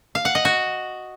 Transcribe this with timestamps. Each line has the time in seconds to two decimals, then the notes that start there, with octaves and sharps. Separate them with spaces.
0.15 F5
0.25 F#5
0.35 D#5
0.45 F#4